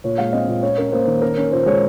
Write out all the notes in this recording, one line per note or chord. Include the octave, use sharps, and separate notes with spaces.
A#2 C#5
G#3 F5
C4 D#5
A#2
C#4 C#5
C#4 A#4
A#3 C5
D#3
C#4 A#4
C#4
A#2 C5
G#3 C#5